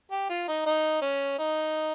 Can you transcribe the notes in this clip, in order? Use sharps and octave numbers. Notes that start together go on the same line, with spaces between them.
G4
F4
D#4
D#4
C#4
D#4